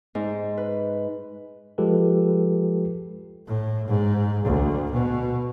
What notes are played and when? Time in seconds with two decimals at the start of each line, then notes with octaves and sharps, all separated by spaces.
0.15 G#2
0.57 B4
1.78 F3 G#3 F4 G4 A4 B4
3.47 A2
3.88 G#2
4.44 D2
4.92 B2